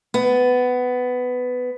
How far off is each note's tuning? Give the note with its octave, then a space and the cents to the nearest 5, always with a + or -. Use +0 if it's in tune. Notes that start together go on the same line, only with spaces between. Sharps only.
B3 +15